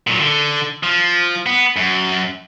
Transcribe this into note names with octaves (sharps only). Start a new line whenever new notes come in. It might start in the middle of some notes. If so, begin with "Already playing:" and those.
A#2 F#3
D3
F3
B3
F#2